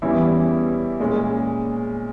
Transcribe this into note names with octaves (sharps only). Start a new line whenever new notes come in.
E2 E3 G3 C#4 E4
A#2 G#3 C#4